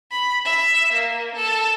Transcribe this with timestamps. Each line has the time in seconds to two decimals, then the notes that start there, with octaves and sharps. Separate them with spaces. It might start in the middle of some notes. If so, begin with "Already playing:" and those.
0.11 B5
0.45 E5
0.93 A#3
1.36 A4